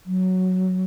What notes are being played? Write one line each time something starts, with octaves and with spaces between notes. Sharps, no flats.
F#3